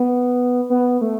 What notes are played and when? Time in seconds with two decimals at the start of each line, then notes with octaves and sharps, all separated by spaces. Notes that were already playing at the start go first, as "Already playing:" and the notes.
Already playing: B3
0.70 B3
1.01 A3